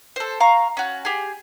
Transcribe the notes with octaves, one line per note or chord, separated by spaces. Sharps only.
A4 C5
F5 A#5 C#6
C#4 F#4
G4 G#4